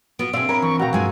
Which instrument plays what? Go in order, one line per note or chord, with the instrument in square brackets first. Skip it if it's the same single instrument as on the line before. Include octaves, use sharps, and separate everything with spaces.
[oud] B3 [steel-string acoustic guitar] F4 F#4 [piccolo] D7
[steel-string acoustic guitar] B2 G#4 [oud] C4 D4 F5 [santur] E5
[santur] A#4 B5 [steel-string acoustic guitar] C#5
[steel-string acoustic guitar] E3 [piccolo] C#6
[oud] D2 B2 [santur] F#4 F5 G5 [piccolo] A#5
[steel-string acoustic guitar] G2 G#3 F4 [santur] C4 [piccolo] G#5